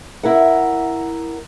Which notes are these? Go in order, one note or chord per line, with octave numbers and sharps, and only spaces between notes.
E4 A#4 F#5